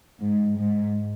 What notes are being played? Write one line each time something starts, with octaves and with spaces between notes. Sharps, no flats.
G#2
G#2